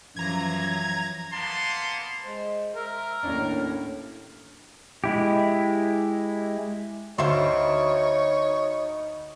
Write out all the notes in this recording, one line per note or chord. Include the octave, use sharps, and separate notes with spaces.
F#2 E3 F3 A#5 G#6
A#3 B3 A5 C6
G#3 C5
A#4 E5
D#2 A2 C#4 D4
G#3 E4 G4
D2 D#4 C5 C#5 E5 C6